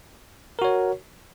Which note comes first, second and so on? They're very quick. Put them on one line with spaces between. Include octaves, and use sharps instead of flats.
A#4 F#4 C#5